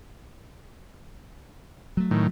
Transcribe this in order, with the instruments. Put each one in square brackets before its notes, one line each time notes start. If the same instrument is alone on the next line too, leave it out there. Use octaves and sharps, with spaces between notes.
[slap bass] F#3 A3
[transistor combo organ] A2 D#3